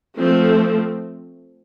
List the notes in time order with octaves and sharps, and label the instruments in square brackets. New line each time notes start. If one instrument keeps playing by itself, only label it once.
[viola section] F3 A3 C4